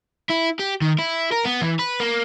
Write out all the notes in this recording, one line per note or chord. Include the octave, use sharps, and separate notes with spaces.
E4
G4
D#3
E4
A#4
B3
E3
B4
A#3